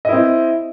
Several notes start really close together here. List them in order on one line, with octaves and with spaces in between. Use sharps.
D#5 E4 C4